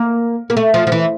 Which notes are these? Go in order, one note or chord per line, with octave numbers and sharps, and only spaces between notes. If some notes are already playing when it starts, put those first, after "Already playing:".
Already playing: A#3
A#3
A3
F3
F3
E3